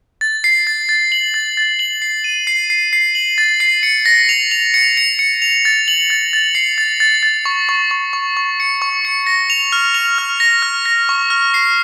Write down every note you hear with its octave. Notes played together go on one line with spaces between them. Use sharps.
A6
C7
A6
A6
F#7
A6
A6
F#7
C7
D#7
C7
C7
C7
F#7
A6
C7
C#7
A#6
F7
F7
C#7
C#7
C#7
F7
A6
F#7
A6
A6
C7
A6
A6
A6
C#6
C#6
C#6
C#6
C#6
C#7
C#6
C#7
A#6
F7
F6
F7
F6
A#6
F6
A#6
C#6
F6
C7